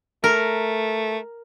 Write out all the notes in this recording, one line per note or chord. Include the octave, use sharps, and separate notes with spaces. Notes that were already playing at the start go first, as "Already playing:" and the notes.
A3 A#4